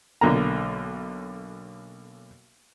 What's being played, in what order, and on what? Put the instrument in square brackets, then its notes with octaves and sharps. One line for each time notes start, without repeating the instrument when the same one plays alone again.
[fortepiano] B1 D3 A#3 A#5